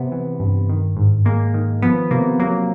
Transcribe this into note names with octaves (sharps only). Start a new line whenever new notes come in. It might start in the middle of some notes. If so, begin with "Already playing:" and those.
Already playing: C3 B3
E3
G2
D#3
G#2
G#3 A#3
D#3
F3 B3
C3 A#3
F#3 A#3